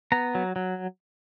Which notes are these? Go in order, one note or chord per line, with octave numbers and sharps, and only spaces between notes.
B3 A#5
F#3
F#3